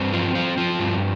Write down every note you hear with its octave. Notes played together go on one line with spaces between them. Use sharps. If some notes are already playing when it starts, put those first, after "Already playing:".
Already playing: G2 C4
F3
F3
F3
G2